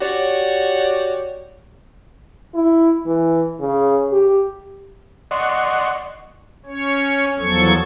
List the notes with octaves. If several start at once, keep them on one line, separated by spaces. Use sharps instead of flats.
F#4 G4 C#5 D5
E4
E3
C#3
G4
D5 D#5 F#5 C6 C#6
C#4 C#5
E2 F3 F#3 A4 C#6 G#6